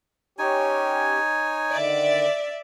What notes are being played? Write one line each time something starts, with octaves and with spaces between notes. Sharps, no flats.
C#4 D#4 G4 C#5 G#5
D3 D#3 D5 E5